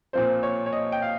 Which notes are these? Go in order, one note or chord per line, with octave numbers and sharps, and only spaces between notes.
A#2 F3 C4 C5
C#5
C#5
D#5
G5
F5